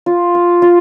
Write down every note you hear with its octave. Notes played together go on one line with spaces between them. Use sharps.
F4
F5
F4